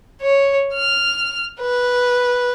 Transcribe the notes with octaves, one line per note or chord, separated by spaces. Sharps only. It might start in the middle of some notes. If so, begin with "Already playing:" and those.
C#5
F6
B4